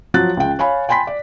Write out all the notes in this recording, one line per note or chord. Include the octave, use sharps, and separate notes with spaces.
F3 F#3 F#5 F#6 A6
C#2 G5
C#5 F5 G#5 B5
G5 G#5 B5 C6 B6
D5